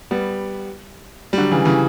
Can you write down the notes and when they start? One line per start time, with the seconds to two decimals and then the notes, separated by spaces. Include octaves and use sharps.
0.11 G3 B3
1.33 G3
1.38 D3 F#3
1.52 C#3 E3
1.65 C#3 E3